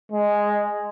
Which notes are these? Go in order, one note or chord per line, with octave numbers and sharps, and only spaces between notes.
G#3